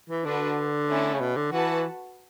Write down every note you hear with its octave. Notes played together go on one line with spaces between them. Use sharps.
E3
D3 D4 F#4 B4
A3 C#4 E4 A4
C#3
B2
D3
E3 F#4 B4 F#5 A5